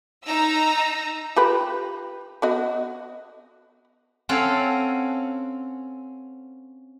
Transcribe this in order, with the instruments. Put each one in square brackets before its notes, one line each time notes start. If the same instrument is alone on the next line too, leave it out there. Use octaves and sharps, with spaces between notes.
[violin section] D#4 A#5 E6
[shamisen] F4 G4 B4
B3 F#4 D#5
[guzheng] C4 C#4 A4 C#5 F5 F#5